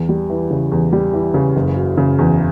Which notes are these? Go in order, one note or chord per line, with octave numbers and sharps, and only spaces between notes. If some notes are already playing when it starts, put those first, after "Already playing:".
Already playing: E2
G3
E3
C#3
E2
G3
E3
C#3
F#1
F#3
C#3
E2